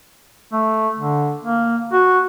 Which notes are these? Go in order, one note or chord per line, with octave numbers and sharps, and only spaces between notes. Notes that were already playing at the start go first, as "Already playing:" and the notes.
A3
D3
A#3
F#4